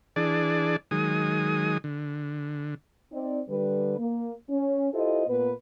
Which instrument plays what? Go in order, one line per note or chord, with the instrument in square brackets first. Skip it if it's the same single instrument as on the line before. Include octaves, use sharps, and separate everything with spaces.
[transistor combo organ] E3 D4 G#4 D5 A5
D#3 F#3 G#3 G#5 D#6
D3
[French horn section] C4 D#4 D5
D3 G3 B4
A#3
C#4
E4 F4 G4 A4 C5 D#5
A#2 B3 B4